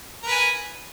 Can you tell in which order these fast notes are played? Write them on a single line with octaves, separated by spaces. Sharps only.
A#4 B4 G#5